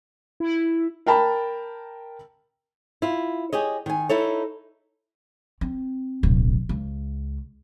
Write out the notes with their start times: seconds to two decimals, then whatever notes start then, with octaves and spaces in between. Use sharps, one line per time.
0.40 E4
1.06 A#4 G5 A5 B5
3.02 E4 F4
3.52 G4 G#4 C#5 D#5
3.86 D#3 G#5
4.09 D#4 E4 A4 C#5
5.61 C4
6.23 D1 B1
6.69 C#2